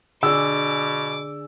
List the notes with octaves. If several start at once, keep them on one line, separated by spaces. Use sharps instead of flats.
B2 D3 G#4 D5 D6 E6